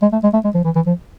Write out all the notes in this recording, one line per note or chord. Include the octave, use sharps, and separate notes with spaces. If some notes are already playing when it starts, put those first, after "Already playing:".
G#3
A3
G#3
A3
G#3
F3
E3
E3
F3